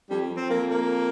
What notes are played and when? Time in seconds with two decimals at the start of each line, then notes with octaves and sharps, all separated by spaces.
0.10 F2 G3
0.30 F2
0.37 C4
0.50 F2 A#3
0.70 A#3